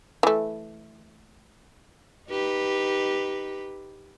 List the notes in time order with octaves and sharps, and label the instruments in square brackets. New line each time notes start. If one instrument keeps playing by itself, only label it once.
[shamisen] E3 A3
[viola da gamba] D#4 G4 B4